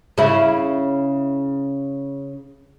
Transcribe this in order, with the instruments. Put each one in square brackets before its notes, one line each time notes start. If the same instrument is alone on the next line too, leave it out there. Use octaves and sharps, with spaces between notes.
[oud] C#3 E4